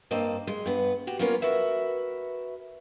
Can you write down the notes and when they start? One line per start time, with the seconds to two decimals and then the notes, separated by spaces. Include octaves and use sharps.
0.11 G2 A#3 C4 D#5 A5
0.47 G#3
0.66 G2 B3 B4
1.07 F#4 G4
1.19 A#3 B3 C#4 F4 A#4 C#5
1.42 F#4 A#4 B4 E5